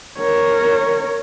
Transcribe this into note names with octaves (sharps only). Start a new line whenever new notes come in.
A#4 C#5